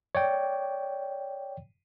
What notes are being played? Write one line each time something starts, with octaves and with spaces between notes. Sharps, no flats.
C#5 D5 G5